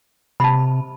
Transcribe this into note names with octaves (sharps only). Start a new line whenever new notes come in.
C3 A5 B5